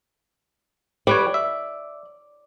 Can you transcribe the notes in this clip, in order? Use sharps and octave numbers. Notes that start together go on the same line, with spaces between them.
G3 B4 C#5 D5
E5